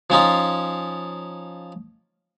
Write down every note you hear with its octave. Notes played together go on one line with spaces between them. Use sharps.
F3 C#4 D#4 F4